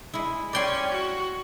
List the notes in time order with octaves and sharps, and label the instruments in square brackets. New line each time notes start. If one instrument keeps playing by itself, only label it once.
[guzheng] G#3 E4
[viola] C#4 [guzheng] D5 G5 C6
[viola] F#4